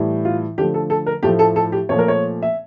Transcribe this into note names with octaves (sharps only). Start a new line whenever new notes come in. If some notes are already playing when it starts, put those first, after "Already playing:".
Already playing: A2 E3 G3
F4
D3 F3 A3 G4
A4
A4
A#4
A2 F3 A3 G4
A4
A4
G4
A#2 F3 A3 C#5
A#4
C#5
E5